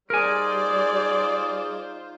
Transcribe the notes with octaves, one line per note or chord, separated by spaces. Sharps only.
G3 D#4 F4 G#4 A#4 C5 D5 G#5